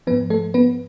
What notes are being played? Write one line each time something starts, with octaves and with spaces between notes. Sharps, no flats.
G#2 F3 B3 B4
A3 A4
B3 B4